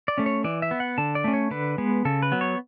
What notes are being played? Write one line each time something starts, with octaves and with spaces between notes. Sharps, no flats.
D5
A3 C#4
C#5
E3 D5
E5
B3
F#5
D3 A5
D5
A3 C#4
C#5
D3 B4
G#3 B3
C#3 A4
B4
F#3 B3
C#5